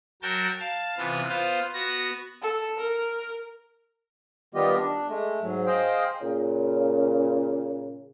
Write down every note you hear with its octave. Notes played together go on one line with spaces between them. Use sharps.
F#3 F#4 A#4 G5 A5 G6
F5 A5
C3 E3 B3 F4
B3 F4 C5 F5
B3 F#4 A#6
A4
A#4
D#3 G3 B3 F4 G4 D#5
D4
G#3 A3
G#2 F#3
G#4 C5 D#5 F5 G5
A#2 C#3